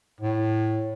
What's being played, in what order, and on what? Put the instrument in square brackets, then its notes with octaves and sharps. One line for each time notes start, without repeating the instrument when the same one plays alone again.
[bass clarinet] A2